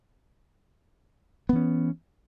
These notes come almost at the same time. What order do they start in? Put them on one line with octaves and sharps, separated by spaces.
B3 E3 C#4